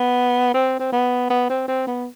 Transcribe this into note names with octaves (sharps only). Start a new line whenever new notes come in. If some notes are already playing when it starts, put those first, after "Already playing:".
Already playing: B3
C4
C4
B3
B3
C4
C4
B3